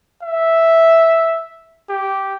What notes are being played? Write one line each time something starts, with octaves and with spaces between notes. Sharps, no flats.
E5
G4